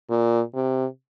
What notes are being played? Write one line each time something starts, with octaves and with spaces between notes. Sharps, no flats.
A#2
C3